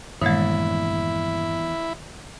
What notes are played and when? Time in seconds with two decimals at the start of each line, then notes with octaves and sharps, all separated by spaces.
0.22 E2 G2 A#2 D#3 G#3 E4